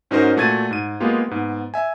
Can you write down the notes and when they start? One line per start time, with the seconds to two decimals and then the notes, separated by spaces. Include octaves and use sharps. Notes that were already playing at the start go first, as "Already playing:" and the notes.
0.11 G#2 C#4 D#4 F#4 A#4 C5
0.37 A#2 A3 F#4 G#6 A6 D#7
0.71 G#2 D#7
1.00 G#3 A#3 B3 F4 G4
1.29 G#2 B3
1.74 E5 G#5